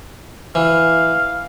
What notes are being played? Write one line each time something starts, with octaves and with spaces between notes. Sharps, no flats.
E3 F5